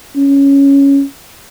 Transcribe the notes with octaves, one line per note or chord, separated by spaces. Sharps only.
C#4